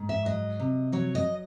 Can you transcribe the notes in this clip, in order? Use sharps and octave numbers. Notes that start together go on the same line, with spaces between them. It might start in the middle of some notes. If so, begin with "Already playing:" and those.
Already playing: G#2
E5
F#3 D#5
C3
F#3 C#5
D#5